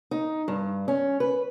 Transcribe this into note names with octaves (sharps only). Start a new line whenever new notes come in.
D#4
G2
C#4
B4